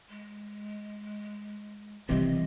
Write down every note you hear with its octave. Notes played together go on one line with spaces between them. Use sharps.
G#3
C3 D#3 E3 G3 D#5